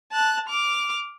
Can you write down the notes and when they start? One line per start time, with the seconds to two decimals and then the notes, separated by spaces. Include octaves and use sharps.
0.12 A5 F#6
0.48 D6 F6